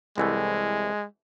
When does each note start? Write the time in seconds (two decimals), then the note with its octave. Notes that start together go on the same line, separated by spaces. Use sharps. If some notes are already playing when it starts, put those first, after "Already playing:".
0.18 C2 E3 G#3 A3